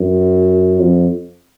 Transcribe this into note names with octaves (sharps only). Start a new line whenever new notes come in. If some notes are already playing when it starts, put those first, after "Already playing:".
Already playing: F#2
F2